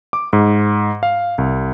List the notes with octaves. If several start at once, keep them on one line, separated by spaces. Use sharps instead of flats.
D6
G#2
F5
C2